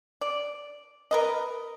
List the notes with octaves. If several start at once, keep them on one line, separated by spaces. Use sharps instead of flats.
D5
A#4 B4 D#5